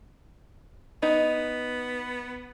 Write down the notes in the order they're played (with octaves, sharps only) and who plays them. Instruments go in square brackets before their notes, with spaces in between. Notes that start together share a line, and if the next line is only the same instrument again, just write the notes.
[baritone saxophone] B3 [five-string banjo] D#4